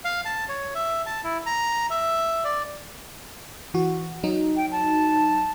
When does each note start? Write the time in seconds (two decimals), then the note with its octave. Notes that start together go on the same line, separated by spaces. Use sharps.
0.05 F5
0.25 A5
0.49 C#5
0.75 E5
1.06 A5
1.24 E4
1.46 A#5
1.90 E5
2.44 D5
3.74 E3 F#4
4.23 F#3 D#4
4.56 G5
4.72 A5